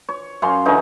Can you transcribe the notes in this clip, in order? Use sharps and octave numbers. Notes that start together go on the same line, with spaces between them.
C#5
F#2 C#4 F5 C6
D3 E3 C#4 D#4